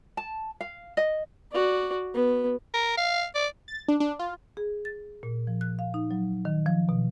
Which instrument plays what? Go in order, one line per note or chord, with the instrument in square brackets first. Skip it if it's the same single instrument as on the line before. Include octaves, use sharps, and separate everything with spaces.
[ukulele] A5
F5
D#5
[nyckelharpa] F#4 D5
B3
[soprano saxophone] A#4
F5
D5
[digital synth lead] A6
D4
D4
F4
[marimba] G#4
A6
A#2
F3
F#6
F5
D#4
F#3
D#3
F3
B2